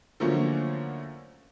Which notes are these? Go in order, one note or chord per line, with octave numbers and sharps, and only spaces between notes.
D3 F3 F#3 A3 A#3 C#4